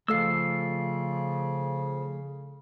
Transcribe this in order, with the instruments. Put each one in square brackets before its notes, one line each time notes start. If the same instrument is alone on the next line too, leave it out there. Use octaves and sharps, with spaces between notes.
[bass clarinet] C#3 [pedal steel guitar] F3 F5 E6 [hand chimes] A3 A4 C7